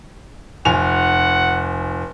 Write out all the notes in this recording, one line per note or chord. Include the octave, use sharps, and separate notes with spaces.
F1 F#5 G#5 F7